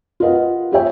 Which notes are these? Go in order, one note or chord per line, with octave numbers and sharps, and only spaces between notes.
F4 A#4 B4 D#5 F5 F#5
F4 G4 C5 C#5 E5 G5